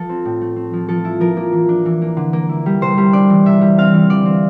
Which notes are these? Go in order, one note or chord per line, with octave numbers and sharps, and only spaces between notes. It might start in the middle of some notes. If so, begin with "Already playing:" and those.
Already playing: F3 A4
C4
A2
A3
C4
F3
F3 A4
E4
F3 A#4
A#3
E3
D4
E3
A#3
D3
A#3
E4
G3
C3 C5
G3
D4 D5
E3
C3 E5
G3
C4 F5
E3
D3 D5
C4